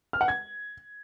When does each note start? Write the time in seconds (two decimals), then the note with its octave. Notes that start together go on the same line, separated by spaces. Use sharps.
0.13 F6
0.21 F#5
0.28 G#6